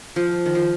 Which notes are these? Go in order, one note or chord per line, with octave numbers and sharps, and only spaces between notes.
F3
D#3
F3